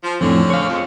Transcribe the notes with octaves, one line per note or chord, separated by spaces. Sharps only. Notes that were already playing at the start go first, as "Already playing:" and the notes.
F3
F2 A2 D3 C4 C#4
C#5 F5
F2 G#3